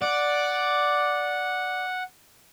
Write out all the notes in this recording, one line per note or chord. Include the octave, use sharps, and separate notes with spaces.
D5 F#5